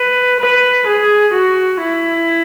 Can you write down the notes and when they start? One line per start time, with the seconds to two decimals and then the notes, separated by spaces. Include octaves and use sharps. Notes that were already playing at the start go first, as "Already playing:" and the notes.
Already playing: B4
0.40 B4
0.87 G#4
1.34 F#4
1.80 E4